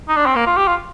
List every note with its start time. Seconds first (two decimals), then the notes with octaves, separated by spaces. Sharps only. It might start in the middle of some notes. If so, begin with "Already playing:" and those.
0.08 D#4
0.17 D4
0.26 C4
0.36 A#3
0.46 F4
0.57 G4
0.67 F4